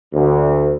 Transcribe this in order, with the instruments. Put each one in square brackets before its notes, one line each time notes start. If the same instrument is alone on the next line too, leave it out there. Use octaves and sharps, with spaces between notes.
[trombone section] D2